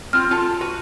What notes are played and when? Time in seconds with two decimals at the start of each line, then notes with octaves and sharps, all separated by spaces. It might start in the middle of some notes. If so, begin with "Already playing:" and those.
0.13 C4 F4 F6
0.31 F4 A4 A5
0.61 F#4 B4